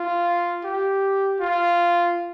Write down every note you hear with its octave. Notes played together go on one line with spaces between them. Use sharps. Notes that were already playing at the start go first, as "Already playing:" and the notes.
Already playing: F4
G4
F4